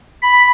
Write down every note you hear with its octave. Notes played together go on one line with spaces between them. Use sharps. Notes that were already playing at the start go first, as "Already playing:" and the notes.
B5